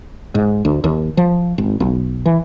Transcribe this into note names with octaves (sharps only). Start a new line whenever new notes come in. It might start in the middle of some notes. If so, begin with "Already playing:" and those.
G#2
D2
D#2
F3
G#1
B1
E3